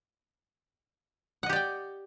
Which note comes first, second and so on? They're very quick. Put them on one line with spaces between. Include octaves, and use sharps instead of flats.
F#5 D#5 G4 D5 G5